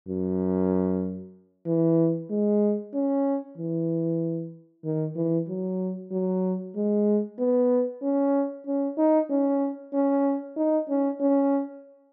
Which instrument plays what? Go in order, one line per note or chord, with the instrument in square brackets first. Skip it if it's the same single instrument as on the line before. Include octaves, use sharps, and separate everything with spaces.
[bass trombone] F#2
E3
G#3
C#4
E3
D#3
E3
F#3
F#3
G#3
B3
C#4
C#4
D#4
C#4
C#4
D#4
C#4
C#4